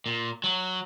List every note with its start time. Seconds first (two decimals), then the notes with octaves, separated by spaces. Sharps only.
0.06 A#2
0.44 F#3